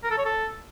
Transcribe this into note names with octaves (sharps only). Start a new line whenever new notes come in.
A#4
A4
C#5
A4